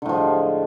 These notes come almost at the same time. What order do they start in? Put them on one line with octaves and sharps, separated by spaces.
D3 A2 F3 G#3